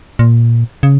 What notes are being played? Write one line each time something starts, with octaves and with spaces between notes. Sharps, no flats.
A#2
C#3